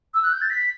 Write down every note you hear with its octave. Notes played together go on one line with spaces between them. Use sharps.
E6
F#6
G6
A6
B6